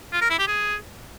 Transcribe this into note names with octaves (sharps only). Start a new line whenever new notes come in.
F4
A#4
E4
G4
G#4